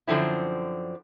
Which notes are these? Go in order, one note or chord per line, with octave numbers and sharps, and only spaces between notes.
F#2 D3 F3 C4 E4